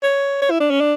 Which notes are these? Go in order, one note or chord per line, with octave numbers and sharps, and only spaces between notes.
C#5
C#5
E4
D4
C#4
D4